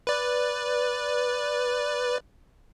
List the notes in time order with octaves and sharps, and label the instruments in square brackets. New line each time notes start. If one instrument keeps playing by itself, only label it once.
[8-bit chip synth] B4 D5